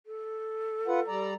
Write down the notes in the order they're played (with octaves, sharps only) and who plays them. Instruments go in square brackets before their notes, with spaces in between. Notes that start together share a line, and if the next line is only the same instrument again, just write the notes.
[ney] A4
[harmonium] F4 B4 F#5
G3 D5 A#5